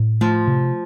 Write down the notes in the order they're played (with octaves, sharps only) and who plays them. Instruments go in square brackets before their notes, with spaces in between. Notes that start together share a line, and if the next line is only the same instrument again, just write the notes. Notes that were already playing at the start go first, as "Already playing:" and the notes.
Already playing: [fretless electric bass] A2
[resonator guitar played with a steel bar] F3 [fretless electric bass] A3
[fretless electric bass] C3